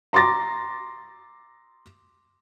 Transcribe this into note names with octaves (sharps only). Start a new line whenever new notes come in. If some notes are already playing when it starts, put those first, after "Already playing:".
A#5 C6 D6 A6 A#6